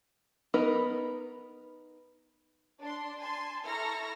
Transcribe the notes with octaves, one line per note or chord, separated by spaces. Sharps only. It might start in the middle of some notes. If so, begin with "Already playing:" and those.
B3 D#4 A#4 B4
D4 C6
G#5 A5 C6
E4 A4 A#5 C#6 F6 A#6